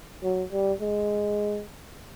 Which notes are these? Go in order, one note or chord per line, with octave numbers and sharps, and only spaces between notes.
F#3
G3
G#3